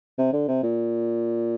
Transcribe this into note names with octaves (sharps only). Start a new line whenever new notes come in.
C3
D3
C3
A#2